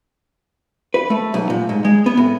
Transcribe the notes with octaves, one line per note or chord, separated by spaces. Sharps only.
B4
A3
B1
A#2
G#2
G#3
B3
A2